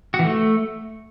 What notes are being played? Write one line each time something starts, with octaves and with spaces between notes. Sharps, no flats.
F#4
E3
A3